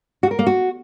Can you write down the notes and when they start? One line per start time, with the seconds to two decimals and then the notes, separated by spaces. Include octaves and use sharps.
0.23 F#4
0.31 A#4
0.39 A#3
0.47 F#4